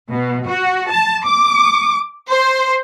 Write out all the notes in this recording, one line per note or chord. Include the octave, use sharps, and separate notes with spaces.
B2
F#4
A5
D6
C5